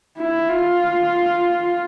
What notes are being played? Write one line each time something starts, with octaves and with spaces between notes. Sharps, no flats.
E4
F4